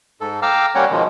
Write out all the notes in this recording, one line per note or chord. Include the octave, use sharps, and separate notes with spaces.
G#2 A4
F5 G5 A#5 D6 E6 F6
G3 A#3 C#4 C#5 F#5 G5
B2 D#3 F3 G#3